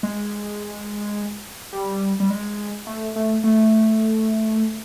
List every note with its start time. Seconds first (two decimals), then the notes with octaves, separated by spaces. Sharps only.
0.03 G#3
1.73 G3
2.20 G3
2.30 G#3
2.87 A3
3.16 A3
3.44 A3